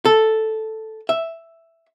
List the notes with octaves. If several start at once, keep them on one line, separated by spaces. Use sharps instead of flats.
A4
E5